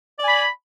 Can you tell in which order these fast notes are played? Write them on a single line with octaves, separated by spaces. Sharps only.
D5 G#5 B5